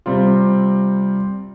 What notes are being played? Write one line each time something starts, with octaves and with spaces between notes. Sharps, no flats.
C3 G3 C4 F4